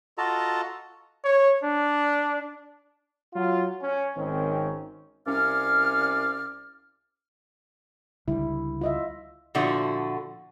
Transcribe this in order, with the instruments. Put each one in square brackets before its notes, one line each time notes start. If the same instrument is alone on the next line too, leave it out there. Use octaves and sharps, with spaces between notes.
[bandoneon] F4 F#4 A4 D#5 A5 A#5
[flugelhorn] C#5
D4
[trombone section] F#3 F4
C#4
G#1 D#3 C4 C#4
[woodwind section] C2 C#4 D5 F5 F6
[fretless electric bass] C#2 D3 G3 [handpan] E4
[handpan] F4 D#5 E5
[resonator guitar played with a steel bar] A#2 D3 F3 E4 F#4